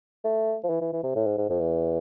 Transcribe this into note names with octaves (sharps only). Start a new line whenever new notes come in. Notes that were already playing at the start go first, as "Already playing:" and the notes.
A3
F3
E3
E3
E3
C3
A2
G#2
G#2
F2
E2